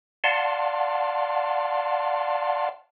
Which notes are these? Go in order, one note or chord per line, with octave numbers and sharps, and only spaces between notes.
D5 F5 F#5 A5 C6